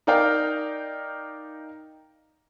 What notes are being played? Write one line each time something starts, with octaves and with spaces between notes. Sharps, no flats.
D#4 A#4 D5 F5 G5